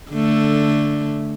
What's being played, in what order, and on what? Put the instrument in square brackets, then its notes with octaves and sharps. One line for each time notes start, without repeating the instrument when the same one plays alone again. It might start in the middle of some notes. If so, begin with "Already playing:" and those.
[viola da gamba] D3 A3